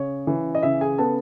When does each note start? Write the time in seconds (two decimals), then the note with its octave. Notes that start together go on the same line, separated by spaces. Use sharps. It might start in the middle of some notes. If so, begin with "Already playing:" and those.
Already playing: C#3 C#5
0.27 E3
0.55 D#5
0.63 C#3 E4 E5
0.81 G#4 G#5
0.98 B3 A4 A5